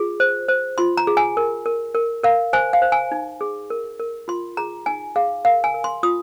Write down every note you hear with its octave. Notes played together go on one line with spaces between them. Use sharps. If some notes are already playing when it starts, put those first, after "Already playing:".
Already playing: F4 G#4
C5
C5
F4 C6
A#5
G#4
G#5
A#4
A#4
A#4
A#4 F5
C5 G#5
F5
C5
G#5
D#4
G#4
A#4
A#4
F4 C6
G#4 A#5
D#4 G#5
G#4 F5
A#4 F5
G#5
A#4
C6
F4 D#6